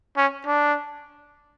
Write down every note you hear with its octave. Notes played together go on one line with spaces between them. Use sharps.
C#4
D4